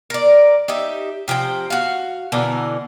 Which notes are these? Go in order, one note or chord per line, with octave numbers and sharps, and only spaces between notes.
A#4 D5
D#4 G4 E5
C3 F3 C4 G5
F#4 F5
B2 D3 E3 A#4